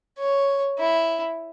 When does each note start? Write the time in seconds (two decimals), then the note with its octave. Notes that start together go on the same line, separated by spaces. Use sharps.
0.19 C#5
0.79 E4